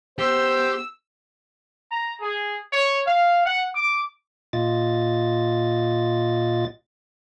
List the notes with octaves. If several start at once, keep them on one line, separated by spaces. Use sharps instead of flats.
B3 G4 C5 E6
A#5
G#4
C#5
F5
F#5
D6
A#2 F4 D#5 A6